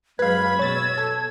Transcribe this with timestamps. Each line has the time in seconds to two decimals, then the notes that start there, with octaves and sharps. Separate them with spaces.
0.19 F#2 G#3 B4 F5 B5 G#6
0.59 B2 C#5 E6 A6
0.98 A4